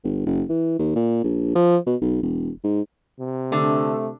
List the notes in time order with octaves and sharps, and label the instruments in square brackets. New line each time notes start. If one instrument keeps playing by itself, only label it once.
[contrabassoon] G1
F#1
E3
D#2
A#2
A#1
F3
B2
B1
E1
G#2
[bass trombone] C3
[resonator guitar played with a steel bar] D3 [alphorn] A3